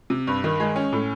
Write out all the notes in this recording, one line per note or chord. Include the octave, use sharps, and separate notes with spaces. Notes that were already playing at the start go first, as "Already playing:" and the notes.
C3
G2
D#3
G#3
C#4
A2